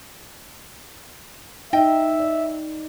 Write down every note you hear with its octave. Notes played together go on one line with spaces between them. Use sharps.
D#4 D#5 E5 G5
D5